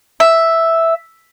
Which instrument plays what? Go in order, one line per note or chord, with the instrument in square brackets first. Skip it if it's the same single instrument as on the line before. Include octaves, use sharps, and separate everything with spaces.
[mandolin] E5